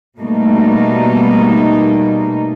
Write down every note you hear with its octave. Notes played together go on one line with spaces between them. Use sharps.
B2 G3 A3 A#3 D#4